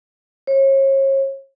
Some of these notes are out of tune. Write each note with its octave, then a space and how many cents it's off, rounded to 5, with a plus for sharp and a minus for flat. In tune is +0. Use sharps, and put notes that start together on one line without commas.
C#5 -40